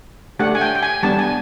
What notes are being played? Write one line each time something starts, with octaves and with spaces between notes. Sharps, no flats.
A3 D4 G4 F#5
G#5
G5
G5
G#5
G3 B3 D4 A5
G#5